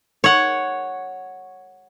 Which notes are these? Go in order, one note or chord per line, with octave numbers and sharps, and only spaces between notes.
C#5 F#5